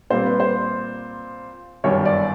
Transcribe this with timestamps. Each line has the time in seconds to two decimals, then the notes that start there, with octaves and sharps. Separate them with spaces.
0.10 A#2 G3 C4 C5
0.25 B4
0.40 C5
1.84 G1 F#2 D#3 G3 C#5
2.05 D5